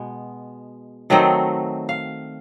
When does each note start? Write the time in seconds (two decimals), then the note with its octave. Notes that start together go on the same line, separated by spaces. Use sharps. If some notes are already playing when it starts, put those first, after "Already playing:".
Already playing: B2 G#3 B3
1.10 D#3 F#3 A3 C4 D#5
1.89 F5